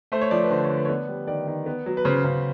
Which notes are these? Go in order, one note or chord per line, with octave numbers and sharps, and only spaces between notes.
A3 C5
C#5
F3 D5
B4
D3 C5
C#5
D3
B4
C#5
B3 D5
G3
D#3 D5
D#3
B3
F#3
B4
C#3 C5
C#3